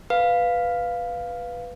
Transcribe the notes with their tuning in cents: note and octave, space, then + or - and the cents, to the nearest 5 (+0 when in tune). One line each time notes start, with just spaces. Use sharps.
B4 +0 F5 +0